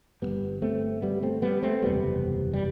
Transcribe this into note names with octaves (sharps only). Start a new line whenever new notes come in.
G1 G2 G3 B3
A3 C4
G3 B3
A3 C4
G3 B3
A3 C4
F#1 E2 C3 G3 B3
G3